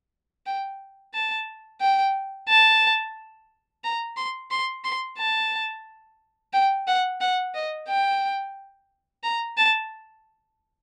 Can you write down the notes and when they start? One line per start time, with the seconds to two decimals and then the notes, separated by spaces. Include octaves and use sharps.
0.46 G5
1.14 A5
1.81 G5
2.49 A5
3.84 A#5
4.17 C6
4.51 C6
4.84 C6
5.18 A5
6.53 G5
6.87 F#5
7.21 F#5
7.55 D#5
7.88 G5
9.23 A#5
9.57 A5